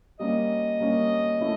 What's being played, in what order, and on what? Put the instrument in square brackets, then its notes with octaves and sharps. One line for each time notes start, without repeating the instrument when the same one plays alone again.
[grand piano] G3 A#3 C#4 [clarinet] D#5
[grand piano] G3 A#3 C#4
A3 C#4 E4